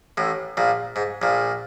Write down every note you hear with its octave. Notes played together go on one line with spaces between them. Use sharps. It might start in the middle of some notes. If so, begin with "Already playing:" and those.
A1 A2
A#1 A#2
G#2
A#1 A#2